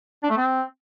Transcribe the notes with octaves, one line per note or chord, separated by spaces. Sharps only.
D4
A3
C4